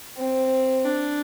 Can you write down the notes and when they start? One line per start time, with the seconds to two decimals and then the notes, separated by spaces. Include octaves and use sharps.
0.18 C4
0.85 D4